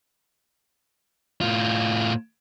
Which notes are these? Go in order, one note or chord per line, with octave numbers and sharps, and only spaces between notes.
A2 F4